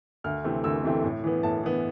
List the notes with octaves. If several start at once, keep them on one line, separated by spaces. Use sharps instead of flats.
D2 F6
C3 E3 A3 C4
D2 E6
C3 E3 A3 C4
A2
E3 B3
A2 A5
E3 B3